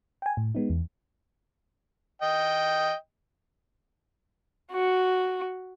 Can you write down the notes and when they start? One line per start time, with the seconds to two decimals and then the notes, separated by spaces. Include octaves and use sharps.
0.22 G5 G#5
0.37 A2
0.55 G#3 B3 D#4
0.70 E2
2.22 D#5 G5
4.72 F#4